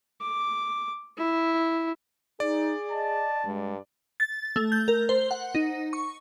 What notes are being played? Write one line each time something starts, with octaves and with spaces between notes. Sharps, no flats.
D6
E4
D#4 G#4 D5
D#5 A5
G2 G#3
A6
A3
G6
A#4
C5
F#5
D#4
C#6